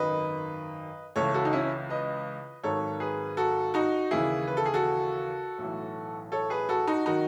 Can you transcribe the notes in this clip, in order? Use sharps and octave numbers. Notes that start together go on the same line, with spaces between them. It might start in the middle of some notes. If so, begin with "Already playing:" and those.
Already playing: G#1 F#2 D#3 B4 D#5
C#2 C#3 E3 A4 C#5
F#4 A4
D#4
C#4 E4
B4 D#5
G#1 G#2 D#3 F#3 A4 C#5
G#4 B4
F#4 A4
D#4 F#4
D#2 C#3 E3 E4 G#4
B4
A4
G#4
F#4 A4
B1 A2 E3
A4 C#5
G#4 B4
F#4 A4
D#4 F#4
D#3 F#3 D#4 F#4